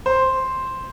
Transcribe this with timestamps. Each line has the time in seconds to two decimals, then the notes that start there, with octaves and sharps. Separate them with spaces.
0.06 C5